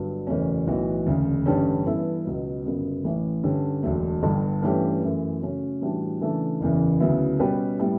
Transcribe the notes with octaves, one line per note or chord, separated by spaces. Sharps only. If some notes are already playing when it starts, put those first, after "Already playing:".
Already playing: G1 G2 F#3
F#1 E2 B2 A3 C#4
B1 A2 E3 B3 F#4
E1 D2 C#3
A1 G2 D3 G3 C#4
G2 E3 B3 E4 A4
C#2 B2 F#3 B3
G1 F#2 C#3 F#3 B3
A1 A2 E3
G2 D3 G3 C#4
E1 D2 D3 F#3 A3
G1 G2 D3
G2 E3 A3 C#4 G4
F#2 E3 A3
C#3 F#3 A3 C#4
A2 E3 G3 D4 F#4
C#3 E3 A3 D4 A4
F#1 E2 C#3 E3
D2 C#3 F#3 B3 E4
B2 G3 C#4 G4 B4
A2 G3 B3 E4 G4